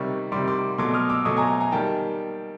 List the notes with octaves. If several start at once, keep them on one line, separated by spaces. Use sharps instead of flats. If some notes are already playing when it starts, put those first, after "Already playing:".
Already playing: C3 D#3 G3 C#6
C3 D#3 G3 C6 D6
C6 D6
B2 F#3 A3 C6 D6
D#6 F6
D6 E6
B2 F#3 A3 C#6 D#6
G#5 A#5
G#5 A#5
D#3 G3 A#3 G5 A5